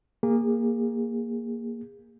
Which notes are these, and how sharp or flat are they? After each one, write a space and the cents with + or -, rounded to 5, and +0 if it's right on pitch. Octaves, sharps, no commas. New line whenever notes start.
A#3 +0 G#4 -30